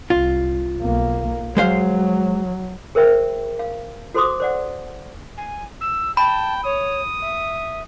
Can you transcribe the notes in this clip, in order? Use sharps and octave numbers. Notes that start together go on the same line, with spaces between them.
C2 F4
B1 A#3
F#3 G#3 C5 F5
G#4 A#4 C5 E5 G5
F5
F#4 A4 C5 C6 D6 D#6
C5 D5 F#5
G#5
E6
G5 A5 B5
C#5 D#6
E5